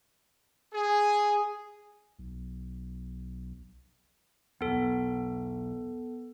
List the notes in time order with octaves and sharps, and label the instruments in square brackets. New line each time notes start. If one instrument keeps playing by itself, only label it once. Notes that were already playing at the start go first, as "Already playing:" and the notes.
[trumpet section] G#4
[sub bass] B1
[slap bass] B1 E2 [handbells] B3 A4